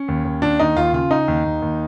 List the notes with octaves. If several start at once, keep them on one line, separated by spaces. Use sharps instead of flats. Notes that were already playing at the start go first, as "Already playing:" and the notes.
Already playing: C#4
D#2
D#2
D#2 D4
D#2 D#4
D#2 F4
C#3 F4
C#3 D#4
D#2
D#2
D#2